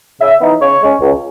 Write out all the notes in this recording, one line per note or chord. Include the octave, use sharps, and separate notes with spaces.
C#3 E5
E3 B3 D#4
C#3 C#5
G#3 C#4
C#2